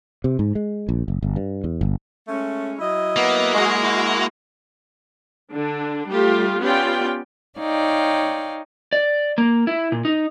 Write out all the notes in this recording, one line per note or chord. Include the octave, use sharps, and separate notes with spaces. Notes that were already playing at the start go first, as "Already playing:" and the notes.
C3
G#2
G#3
A#1
F#1
G1
G2
E2
G1
G#3 A3 C#4
F#3 E4 D#5
A#3 B3
G#3 F#4 G#4
E4 F#4
D3 D4
G3 A3 F4 G4
B3 C#4 F4 G4 D5 G5
D#4 C#5 D5 F5 G5
D5
A#3
E4
A#2
D#4